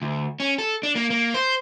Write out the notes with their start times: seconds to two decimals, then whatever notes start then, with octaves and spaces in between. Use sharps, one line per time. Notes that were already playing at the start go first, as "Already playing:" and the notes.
0.02 D2
0.40 C#4
0.58 A4
0.83 D4
0.95 A#3
1.10 A#3
1.34 C5